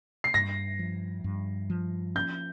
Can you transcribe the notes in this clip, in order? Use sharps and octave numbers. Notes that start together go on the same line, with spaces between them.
C7
G2 A#6
F3
G2
F3
C#4 G6